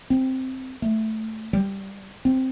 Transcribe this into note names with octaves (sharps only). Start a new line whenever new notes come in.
C4
A3
G3
C4